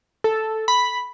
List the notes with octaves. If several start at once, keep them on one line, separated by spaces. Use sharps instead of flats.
A4
B5